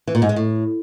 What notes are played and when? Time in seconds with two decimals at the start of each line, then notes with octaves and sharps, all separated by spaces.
0.07 E3
0.15 A#2
0.22 G#2
0.29 G#3
0.36 A2